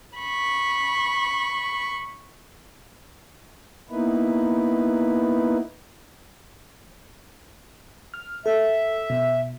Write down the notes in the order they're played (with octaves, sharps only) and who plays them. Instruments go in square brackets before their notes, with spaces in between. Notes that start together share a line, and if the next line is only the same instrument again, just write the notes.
[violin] B5 C#6
[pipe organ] A#3 B3 D#4 E4 B4
[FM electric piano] F6
[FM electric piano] A4 [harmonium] E5
[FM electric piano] B2